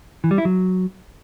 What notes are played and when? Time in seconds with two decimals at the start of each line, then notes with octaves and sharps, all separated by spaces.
0.24 E3
0.31 G3
0.38 E4
0.45 F#3